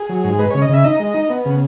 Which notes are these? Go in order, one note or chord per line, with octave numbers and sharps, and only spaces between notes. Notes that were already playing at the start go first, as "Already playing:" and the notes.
Already playing: G#4
F#3
G#2
G#3 B4
C#3 C#5
D#5
C#3 E5
D#4 D#5
G#3
D#4
B3
C#3